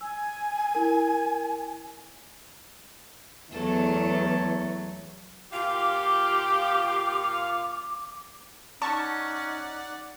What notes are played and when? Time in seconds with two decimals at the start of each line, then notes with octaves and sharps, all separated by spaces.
0.01 G#5 E6
0.75 E4 A#4
3.52 E2 F#3 A3 A4
5.53 A#2 F4 G4 F5 D6
8.82 C#4 D#4 D5 F#5 A5 C#6